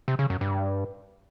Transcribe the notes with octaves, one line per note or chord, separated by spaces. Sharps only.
C3
C#3
F#2
G2